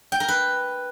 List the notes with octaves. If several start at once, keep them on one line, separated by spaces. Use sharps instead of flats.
G5
A#4
B4